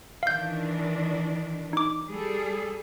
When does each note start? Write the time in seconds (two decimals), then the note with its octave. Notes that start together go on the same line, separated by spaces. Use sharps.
0.23 D#3 E3 D4 F5 G6
1.73 D#4 D6
2.08 G3 G#4 A4